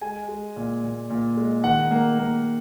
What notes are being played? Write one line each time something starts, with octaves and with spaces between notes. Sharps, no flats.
G#3 G#5
G#3
A#2
A#2
A#2
G#3
D#3 F#5
A#3
A#3